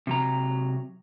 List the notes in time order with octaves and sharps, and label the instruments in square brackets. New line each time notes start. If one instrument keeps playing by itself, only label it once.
[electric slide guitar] C3 F#3 A#5